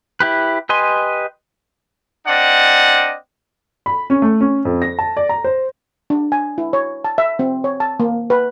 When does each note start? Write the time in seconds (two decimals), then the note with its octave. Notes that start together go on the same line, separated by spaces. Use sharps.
0.20 E4 G4 B4
0.69 G4 B4 D#5 G#5 C6
2.27 C4 D4 D5 D#5 F#5
3.86 B5
4.10 C#4
4.22 A3
4.41 C#4
4.65 F2
4.82 A#6
4.99 A5
5.17 D5
5.29 A#5
5.44 C5
6.10 D4
6.32 G#5
6.58 E4
6.73 C#5
7.04 A5
7.18 E5
7.39 C4
7.64 C#5
7.80 A5
8.00 A#3
8.30 B4